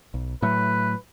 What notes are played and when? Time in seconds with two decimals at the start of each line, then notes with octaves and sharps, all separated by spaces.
0.14 B1
0.42 A2 F#3 A3 B4